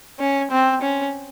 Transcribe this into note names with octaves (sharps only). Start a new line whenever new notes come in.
C#4
C4
C#4